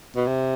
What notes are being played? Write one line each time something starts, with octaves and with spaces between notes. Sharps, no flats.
B2
C3